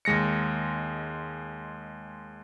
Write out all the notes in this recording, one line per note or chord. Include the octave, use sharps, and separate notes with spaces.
D#2 G#3 A#6 C#7